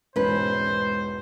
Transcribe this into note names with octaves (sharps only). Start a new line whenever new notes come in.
E1 E2 G#2 C#4 B4 C5